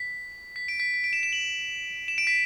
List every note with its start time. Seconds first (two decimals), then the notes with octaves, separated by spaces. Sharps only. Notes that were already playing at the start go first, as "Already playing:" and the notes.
Already playing: B6
0.56 B6
0.68 D7
0.80 B6
0.94 B6
1.04 D7
1.13 E7
1.23 E7
1.33 F#7
2.08 E7
2.18 D7
2.27 B6